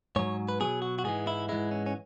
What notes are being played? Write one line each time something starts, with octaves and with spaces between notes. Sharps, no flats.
G#2 F#3 C#5
B4
B2 F#3 G#4
F#4
F#4
G#2 E3 G#3 G#4
E4
G#2 E3 G#3 E4
C#4
C#4